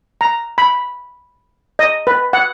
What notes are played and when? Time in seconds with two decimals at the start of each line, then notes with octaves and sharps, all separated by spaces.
0.21 A#5
0.58 B5
1.79 D#5
2.07 B4
2.33 F#5